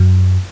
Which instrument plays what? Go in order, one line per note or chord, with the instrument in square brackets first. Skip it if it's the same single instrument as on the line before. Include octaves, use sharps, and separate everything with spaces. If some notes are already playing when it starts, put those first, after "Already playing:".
Already playing: [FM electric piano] F#2